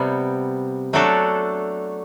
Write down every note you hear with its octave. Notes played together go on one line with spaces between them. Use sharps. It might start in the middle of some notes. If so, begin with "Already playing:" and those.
Already playing: C3 G3 B3
F#3 A3 D4 F#4 A4